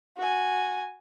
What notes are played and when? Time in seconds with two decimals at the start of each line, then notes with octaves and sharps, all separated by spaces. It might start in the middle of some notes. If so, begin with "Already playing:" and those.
0.18 F#4 G#5